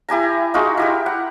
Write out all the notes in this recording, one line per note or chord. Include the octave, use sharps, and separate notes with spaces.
E4 G4 G#5 A#5
D#4 F4 F#4 G#4
E4 G4 A#4
F#5